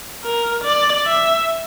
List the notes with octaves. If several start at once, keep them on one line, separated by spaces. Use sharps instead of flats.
A#4
D5
E5